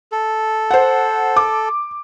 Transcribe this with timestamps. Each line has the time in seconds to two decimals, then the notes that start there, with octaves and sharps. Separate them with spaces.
0.12 A4
0.71 C5 F#5
1.36 D6